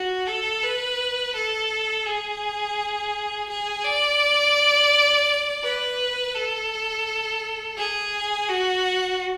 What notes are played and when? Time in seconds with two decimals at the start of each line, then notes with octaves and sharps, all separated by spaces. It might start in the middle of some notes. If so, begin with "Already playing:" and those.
Already playing: F#4
0.27 A4
0.63 B4
1.34 A4
2.06 G#4
3.49 G#4
3.84 D5
5.63 B4
6.35 A4
7.77 G#4
8.49 F#4